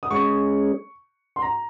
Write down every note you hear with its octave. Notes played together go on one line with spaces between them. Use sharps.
D#6
G#3 C#4 G#4 C#6
C6
A#5